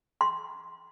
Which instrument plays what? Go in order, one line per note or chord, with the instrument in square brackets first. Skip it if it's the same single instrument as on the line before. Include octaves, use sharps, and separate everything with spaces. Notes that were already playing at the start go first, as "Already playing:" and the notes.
[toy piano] C6